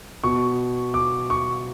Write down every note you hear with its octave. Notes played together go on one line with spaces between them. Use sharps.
B2 C#6
D6
C#6